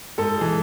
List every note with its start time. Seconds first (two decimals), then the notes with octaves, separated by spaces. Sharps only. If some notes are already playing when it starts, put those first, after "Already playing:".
0.18 G#2 A4
0.37 E3 G#3